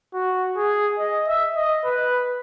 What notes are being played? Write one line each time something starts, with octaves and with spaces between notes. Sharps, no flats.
F#4
G#4
D#5
E5
D#5
B4